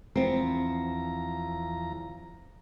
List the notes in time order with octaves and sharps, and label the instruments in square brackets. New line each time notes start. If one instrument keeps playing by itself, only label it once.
[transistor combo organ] E2 F3 A#5 [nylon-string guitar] B3 C4